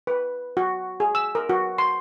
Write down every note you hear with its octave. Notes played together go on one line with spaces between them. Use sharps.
B4
F#4
G#4
E6
A#4
F#4
C6